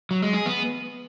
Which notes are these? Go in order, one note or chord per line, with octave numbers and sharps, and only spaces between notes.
F#3
G#3
G#4
B3